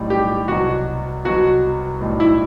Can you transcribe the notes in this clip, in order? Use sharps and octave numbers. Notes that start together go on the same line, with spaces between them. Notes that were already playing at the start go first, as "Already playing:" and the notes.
Already playing: B1 A2 G3
G4
C2 B2 F#3 F#4
C2 B2 F#3 F#4
B1 A2 G3
E4